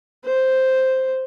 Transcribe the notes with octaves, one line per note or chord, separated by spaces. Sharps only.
C5